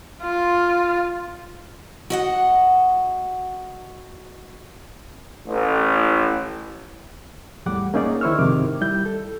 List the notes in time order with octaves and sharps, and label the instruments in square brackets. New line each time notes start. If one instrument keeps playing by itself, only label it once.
[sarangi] F4
[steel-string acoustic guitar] F#4 D#5 F#5
[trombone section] A1
[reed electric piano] E2 A2 G3 F#5 D6
A#3 C#4 D#4 G#4 D5
D#3 E4 C5 C#6 E6 F6
F2 G#2 C3 D#3 D6
G3 E4 G6
A4